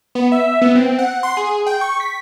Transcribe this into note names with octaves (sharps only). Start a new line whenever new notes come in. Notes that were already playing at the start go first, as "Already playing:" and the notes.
B3
E5
B3
C4
F#5
C6
G#4
G5
C#6
B6